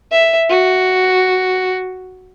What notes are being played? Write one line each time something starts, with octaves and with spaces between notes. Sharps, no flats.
E5
F#4